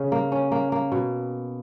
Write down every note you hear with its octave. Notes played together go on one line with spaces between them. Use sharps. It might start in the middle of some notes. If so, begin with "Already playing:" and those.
Already playing: C#3 C#4
A#3
C#4
A#3
A#3
B2